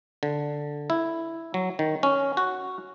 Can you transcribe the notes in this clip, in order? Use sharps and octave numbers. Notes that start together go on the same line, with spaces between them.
D3
E4
F#3
D#3
C#4
F#4